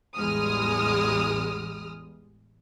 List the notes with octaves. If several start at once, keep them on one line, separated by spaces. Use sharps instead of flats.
A1 E2 G3 G#3 D#6 F6